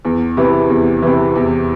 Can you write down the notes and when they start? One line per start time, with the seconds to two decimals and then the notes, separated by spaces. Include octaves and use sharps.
0.05 E2
0.37 C3 E3
0.69 E2
1.02 C3 E3
1.36 E2